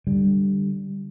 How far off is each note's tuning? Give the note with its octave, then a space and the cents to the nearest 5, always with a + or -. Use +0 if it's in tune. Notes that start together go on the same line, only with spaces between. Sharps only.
D3 +0 G3 +0